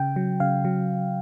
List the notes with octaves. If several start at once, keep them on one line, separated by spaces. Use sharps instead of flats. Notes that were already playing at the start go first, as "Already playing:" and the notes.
Already playing: C#3 G5
F#3
C#3 F5
F#3